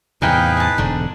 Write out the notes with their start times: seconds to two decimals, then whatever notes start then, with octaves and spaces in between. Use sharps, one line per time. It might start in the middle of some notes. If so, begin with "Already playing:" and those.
0.22 E2 A2 C3 D#4 G#4 B4 F5 G5
0.57 G#5 A5
0.78 E1 G#2 D3 D4